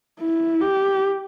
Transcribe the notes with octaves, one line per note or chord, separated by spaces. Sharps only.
E4
G4